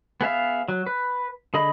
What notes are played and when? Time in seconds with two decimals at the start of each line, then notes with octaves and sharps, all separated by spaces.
0.21 B3 G#4 E5 F5
0.68 F#3
0.87 B4
1.54 D3 G#4 D#5 B5